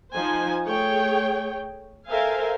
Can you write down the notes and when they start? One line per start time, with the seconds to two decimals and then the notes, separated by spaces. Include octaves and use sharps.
0.14 F3 D#4 C5 G#5
0.66 A3 G#4 C#5 G5
2.08 A4 A#4 C5 E5 F5 G#5